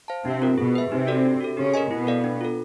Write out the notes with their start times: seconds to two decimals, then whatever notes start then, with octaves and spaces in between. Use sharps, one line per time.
0.08 C5 F5 A5
0.25 C3 C4 D4
0.42 F4 A#4
0.58 B2 B3 G#4
0.75 B4 E5
0.91 C3 C4 D#4
1.07 F#4 A4 D5
1.25 D4
1.41 F#4 A4
1.57 C#3 C#4 G4
1.74 A#4 D#5 G#5
1.90 B2 B3 E4
2.07 A4 D5 F5
2.24 D4
2.41 F4 A4